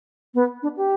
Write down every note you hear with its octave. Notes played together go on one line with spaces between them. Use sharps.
B3
D4
G4